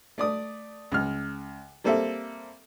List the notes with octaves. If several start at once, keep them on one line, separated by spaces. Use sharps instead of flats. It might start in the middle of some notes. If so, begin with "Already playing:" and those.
A3 D5 D#6
C#2 F6
G3 A#3 C4 A4 E5